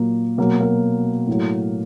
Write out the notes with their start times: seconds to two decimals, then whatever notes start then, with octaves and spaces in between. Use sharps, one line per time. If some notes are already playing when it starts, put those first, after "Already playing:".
Already playing: A#2 F#3 A#3
0.38 B2 F#3 A#3
0.61 A#3
1.27 A2 F#3